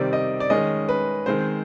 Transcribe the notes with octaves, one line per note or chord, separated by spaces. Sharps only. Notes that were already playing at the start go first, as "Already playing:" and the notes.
Already playing: C3 D#3 G3 C4 D5
D#5
D5
D#3 G#3 C#4 D#5
B4
D#3 G#3 C4 C5